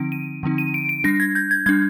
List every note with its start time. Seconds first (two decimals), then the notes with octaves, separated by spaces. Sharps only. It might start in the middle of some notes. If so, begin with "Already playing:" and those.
Already playing: D3 F3 C4 D#4 D7
0.12 D#7
0.43 D3 F3 C4 D#4
0.58 D#7
0.74 D7
0.89 D7
1.04 G3 D4 A#6
1.20 G#6
1.35 G6
1.51 G#6
1.66 G3 D4 G#6